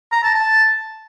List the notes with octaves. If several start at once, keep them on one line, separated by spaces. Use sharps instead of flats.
A#5
A5
A5